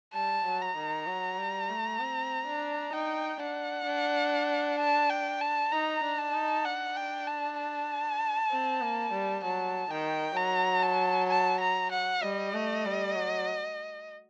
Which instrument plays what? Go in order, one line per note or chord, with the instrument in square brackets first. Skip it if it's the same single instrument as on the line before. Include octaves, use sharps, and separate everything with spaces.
[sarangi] G3 [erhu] A5
[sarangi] F#3
[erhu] A#5
[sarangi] D#3
F#3
G3
A3
C4
D4
[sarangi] D#4 [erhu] G5
[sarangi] D4 [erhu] F#5
[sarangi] D4
[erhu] A5
G5
A5
[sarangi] D#4 [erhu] A#5
[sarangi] D4
[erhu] A5
[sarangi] D#4
[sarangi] D4 [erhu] F#5
[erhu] G5
A5
A5
[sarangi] C4
A#3
G3
[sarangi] F#3 [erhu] A5
[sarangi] D#3 [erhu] G5
[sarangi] F#3 [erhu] A#5
[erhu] A5
A5
A#5
F#5
[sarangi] G3 [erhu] D#5
[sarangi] A3
G3
F#3